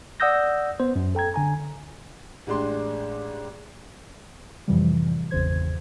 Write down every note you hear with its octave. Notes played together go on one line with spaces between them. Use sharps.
D5 F#5 D#6 E6 G6 A#6
B3 C5
F#2
A4 G5 A#5 G#6
D3 G#5 A#5
A1 G#3 D4 G4 C6
F2 A2 C3 E3 F3 G3
G#1 E2 C#3 C5 G#6